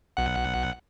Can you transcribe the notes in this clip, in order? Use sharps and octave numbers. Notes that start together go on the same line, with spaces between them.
B1 F#5